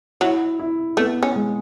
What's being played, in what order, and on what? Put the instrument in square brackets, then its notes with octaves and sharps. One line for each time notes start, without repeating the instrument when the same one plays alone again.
[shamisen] F#3 [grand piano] E4
[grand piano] E4
[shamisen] A3 [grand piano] B3
[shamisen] C#4
[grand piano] G#3